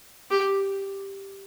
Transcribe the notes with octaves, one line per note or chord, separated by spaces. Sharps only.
G4